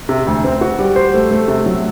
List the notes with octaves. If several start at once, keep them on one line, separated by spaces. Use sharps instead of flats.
C3
D2
C4
F#4
G3
C5
A3
A3
C3
F#3